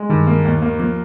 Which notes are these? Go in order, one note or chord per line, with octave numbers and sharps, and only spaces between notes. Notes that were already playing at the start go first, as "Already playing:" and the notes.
Already playing: G#3
G2 D#3
A#3
D#2
A#3
F3 A#3